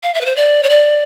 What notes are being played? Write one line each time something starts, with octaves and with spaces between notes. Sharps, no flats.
F5
E5
B4
C5
D5
C#5
D5